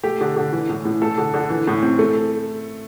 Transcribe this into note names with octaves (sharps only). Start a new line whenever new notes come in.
A3 G4
D3
D3
E3
A2
A2
A3 A4
D3
D3
E3
A2
C4
A3